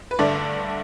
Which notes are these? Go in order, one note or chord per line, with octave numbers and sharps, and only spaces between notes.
B4
G2 D3 A3 D4 D5